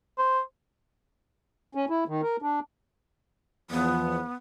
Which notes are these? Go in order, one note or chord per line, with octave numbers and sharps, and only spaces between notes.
C5
C#4
E4
D#3
A#4
D4
E2 F3 B3